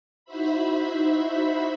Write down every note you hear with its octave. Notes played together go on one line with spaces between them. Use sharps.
D#4 E4 F#4 C5 E5 B5